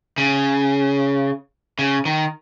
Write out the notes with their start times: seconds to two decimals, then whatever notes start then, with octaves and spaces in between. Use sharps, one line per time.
0.18 C#3
1.79 C#3
2.05 D#3